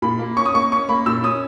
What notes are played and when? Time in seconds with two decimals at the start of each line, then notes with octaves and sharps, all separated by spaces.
0.02 A#2 B5
0.19 A#3
0.37 C#4 C#6
0.46 D#6
0.54 A#3 C#6
0.72 C#4 C#6
0.89 A#3 B5
1.06 A#2 E6
1.24 C#4 D#6